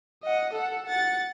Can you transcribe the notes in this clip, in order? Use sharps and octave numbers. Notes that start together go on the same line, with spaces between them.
D#5 F#5
A4 F#5
F#5 A6